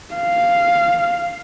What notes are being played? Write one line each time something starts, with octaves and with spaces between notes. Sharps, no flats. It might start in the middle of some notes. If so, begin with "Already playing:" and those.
F5